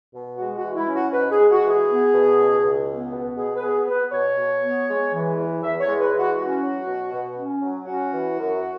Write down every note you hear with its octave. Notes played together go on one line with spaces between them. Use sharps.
B2
G#3 F#4
F#4
E3
E4
C#4
F#4
G#2 B4
G#4
G#3
F#4
E3
G#4
B3
B2
C#2
C#2
B3
B2
B2 G#4
B4
B3 G#4
B3 B4
B2 C#5
B2
B3
G#3
E3
E2
E2 E5
C#5
G#3
B4
E3
F#4
C#4 F#4
F#3
B2
B2
C#4
F#3
C#4 F#4
E3
F#2